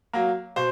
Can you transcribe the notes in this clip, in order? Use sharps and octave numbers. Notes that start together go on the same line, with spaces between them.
F#3 A#3
B2 C5